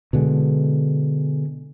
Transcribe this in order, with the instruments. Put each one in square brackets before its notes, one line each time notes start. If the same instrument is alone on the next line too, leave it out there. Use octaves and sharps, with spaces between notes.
[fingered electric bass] B2 D3 G#3